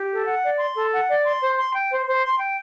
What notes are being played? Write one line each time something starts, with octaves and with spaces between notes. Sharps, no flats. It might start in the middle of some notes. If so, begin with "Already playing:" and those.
Already playing: G4
A4
F#5
D5
C6
A4
F#5
D5
C6
C5
C6
G5
C5
C5
C6
G5